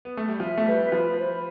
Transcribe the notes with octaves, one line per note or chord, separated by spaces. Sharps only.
B3
A3
G3
F3 E5
A3
G3 B4
F3 B5
C5